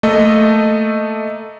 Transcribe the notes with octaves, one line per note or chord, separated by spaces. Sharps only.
A3 A#3 A4 D#5